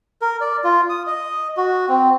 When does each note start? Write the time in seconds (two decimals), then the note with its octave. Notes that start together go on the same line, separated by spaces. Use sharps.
0.22 A#4
0.41 D5
0.64 F4
0.89 D#6
1.07 D#5
1.57 F#4
1.89 C4